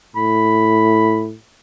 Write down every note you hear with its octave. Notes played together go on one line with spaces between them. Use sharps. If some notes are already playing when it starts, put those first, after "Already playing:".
A2 B5